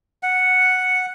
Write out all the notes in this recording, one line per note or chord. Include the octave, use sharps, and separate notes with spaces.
F#5